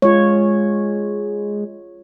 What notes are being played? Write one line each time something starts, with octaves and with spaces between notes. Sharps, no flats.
G#3 F4 C#5